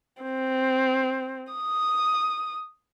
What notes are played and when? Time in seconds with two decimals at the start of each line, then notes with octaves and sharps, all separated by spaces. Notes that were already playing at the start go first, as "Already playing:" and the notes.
0.22 C4
1.53 D#6